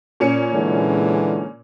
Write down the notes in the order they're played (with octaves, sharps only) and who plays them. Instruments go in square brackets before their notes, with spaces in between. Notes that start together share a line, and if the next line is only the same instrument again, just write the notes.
[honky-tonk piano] A#2 C#4 C#7
[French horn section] D3 E3 G#3